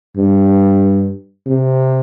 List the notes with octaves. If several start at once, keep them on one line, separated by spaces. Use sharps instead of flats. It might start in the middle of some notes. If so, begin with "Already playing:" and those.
G2
C3